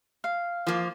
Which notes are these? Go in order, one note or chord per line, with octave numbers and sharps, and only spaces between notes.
F5
F3 A#3